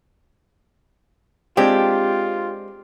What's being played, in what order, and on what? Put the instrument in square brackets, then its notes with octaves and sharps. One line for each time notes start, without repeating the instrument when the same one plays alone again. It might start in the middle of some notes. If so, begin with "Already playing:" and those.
[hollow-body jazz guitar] G#3 C4 D4 [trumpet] F4 [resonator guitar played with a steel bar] G4